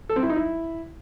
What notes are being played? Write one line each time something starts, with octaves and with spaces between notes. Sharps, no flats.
A4
C4
E4
D#4
E4